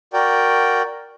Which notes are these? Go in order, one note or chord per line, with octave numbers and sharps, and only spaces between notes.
F#4 A#4 D5 G5